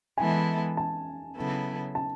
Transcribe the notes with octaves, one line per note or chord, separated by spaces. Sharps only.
E3 G#3 B3 E4 A4 G#5
A5
C#3 F#3 B3 E4 A4
A5